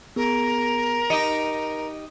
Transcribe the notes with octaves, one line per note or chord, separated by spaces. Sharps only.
B3 G#4 A#4
D#4 G4 D#5 C#7